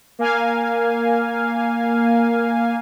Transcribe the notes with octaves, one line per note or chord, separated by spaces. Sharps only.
A#3 F5 G#5